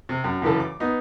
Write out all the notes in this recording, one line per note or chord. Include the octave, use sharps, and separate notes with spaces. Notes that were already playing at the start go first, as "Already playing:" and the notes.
C3
F#2
F#2 C#3 E3 A4
D6
B3 D#4